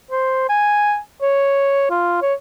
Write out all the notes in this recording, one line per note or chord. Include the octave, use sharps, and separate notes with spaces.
C5
G#5
C#5
F4
C#5